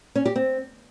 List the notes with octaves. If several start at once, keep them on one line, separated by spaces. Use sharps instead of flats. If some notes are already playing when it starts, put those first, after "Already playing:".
C#4
G4
C4